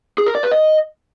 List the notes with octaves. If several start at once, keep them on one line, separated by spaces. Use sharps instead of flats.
G#4
A#4
D5
B4
D#5